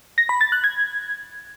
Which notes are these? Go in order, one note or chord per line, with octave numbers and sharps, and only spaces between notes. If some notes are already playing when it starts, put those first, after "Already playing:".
A#6
B5
A6
F#6
G#6